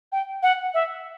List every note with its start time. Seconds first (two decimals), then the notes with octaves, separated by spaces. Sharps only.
0.12 G5
0.43 F#5
0.74 E5